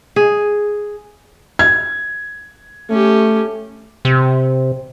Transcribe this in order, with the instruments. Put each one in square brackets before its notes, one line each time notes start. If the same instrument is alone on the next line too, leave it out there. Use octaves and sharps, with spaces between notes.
[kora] G#4
[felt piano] G#6
[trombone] A3 [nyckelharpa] C#4 G4
[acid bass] C3